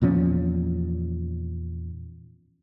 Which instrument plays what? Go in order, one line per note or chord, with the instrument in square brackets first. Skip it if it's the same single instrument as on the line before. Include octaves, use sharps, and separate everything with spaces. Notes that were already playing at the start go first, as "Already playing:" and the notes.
[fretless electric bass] E2 A#2 F3 C#4